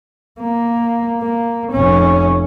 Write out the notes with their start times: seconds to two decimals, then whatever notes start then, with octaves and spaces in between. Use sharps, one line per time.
0.40 A#3
1.22 A#3
1.72 F1 C#4